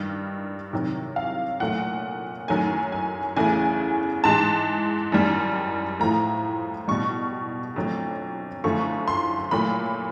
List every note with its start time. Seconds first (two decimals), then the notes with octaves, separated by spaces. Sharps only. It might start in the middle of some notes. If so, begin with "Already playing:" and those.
Already playing: G2 D#3 G3
0.73 C3 D#3 F#3
1.16 F5
1.60 A#2 F#3 A3 F#5
2.48 F#2 D#3 F#3 A3 G#5
2.92 G#5
3.36 E2 C#3 E3 A3 G#5
4.24 G#2 E3 G#3 A5
5.12 F#2 D#3 G3
6.00 A2 F3 A3 A#5
6.88 B2 G3 C#6
7.76 F2 D3 F#3 A3
8.64 F#2 D3 F3 A3 C#6
9.08 C6
9.51 A#2 F#3 A3 B5